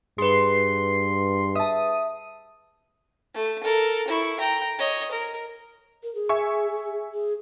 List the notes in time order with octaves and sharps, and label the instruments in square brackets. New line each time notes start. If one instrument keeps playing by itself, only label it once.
[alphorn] G2 [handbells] G#4 B4 [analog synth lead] C6
[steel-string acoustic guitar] E5 A5 [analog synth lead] D#6
[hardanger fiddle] A3
A4 A#4
E4 C#6
G5 A#5
C#5 D#5
A#4
[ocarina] A#4
G#4
[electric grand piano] E5 G#5 C#6
[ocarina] G#4